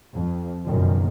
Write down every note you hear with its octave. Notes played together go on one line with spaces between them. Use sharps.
F2
F#1 B1 F#2 A#2 D#3